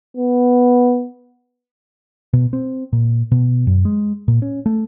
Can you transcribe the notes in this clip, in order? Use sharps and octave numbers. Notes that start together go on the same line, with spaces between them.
B3
B2
C4
A#2
B2
F#2
G#3
A#2
C#4
A3